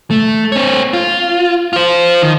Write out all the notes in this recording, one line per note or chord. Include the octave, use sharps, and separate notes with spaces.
A3
C4 C#5
F4
F4 C5
D#3